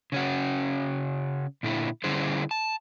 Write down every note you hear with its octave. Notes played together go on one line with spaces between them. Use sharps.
C#3 C#4 F#4
A#2 D3 E4
D3 G3 C#4 E4 G#4 C5
A5